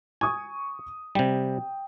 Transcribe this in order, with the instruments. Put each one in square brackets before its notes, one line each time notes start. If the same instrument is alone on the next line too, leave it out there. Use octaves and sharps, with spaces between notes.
[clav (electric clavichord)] G#5 [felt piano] C#6 D#6
[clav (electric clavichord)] C3 G3 [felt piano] G5